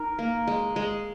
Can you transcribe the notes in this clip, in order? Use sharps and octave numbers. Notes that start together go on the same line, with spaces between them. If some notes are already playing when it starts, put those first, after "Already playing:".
Already playing: D#4 A#4
A#3
G#3
G#3